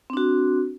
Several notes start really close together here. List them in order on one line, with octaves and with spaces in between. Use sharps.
C4 D4 F#4